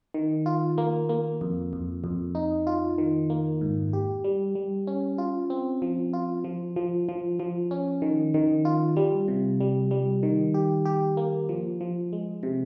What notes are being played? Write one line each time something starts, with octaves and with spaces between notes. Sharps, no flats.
D#3
F4
A#3
A#3
F2
F2
F2
D#4
F4
D#3
A#3
G#2
G4
G3
G3
C#4
F4
C4
F3
F4
F3
F3
F3
F3
C#4
D#3
D#3
F4
G3
C3
G3
G3
D#3
G4
G4
A#3
F3
F3
G#3
C3